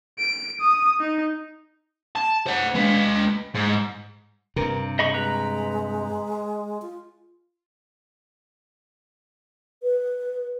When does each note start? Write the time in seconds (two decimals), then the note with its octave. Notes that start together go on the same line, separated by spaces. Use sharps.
0.19 D7
0.61 D#6
1.00 D#4
2.16 A5
2.47 C5 F#5
2.75 G#3 B4
3.55 G#2
4.56 G2 C3 D4 A#4 B4
4.99 G#4 C5 D#5 B5 C#6
5.14 G#3 F#4 B4 A#5
6.82 F4
9.83 B4